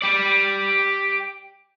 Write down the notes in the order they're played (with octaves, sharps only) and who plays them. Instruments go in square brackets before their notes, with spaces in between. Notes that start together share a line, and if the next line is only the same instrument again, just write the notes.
[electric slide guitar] G4 D5